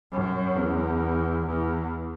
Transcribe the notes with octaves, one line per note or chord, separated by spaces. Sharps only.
F#2
E2
E2